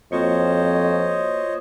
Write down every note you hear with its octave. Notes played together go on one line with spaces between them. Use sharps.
F2 A#3 F4 F#4 C5 C#5 D#5